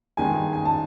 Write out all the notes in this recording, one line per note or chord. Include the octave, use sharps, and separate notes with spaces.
G2 D#3 G#3 G#5
G#5
A5